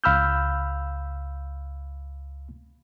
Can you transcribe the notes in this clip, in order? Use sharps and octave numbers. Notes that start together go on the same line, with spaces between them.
C#2 F5 B5 E6 F6 G6